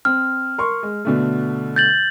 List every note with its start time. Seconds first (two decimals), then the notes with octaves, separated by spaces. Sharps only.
0.05 C4 F6
0.58 A#4 C6 C#6
0.83 G#3
1.05 B2 D3 A3
1.76 G6 A6 F#7